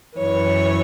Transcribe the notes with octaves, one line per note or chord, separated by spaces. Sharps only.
F#2 E3 C#5